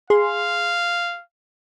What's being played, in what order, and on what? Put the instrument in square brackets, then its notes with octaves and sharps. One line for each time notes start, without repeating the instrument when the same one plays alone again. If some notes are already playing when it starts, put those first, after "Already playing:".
[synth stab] G#4 C6 [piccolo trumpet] F5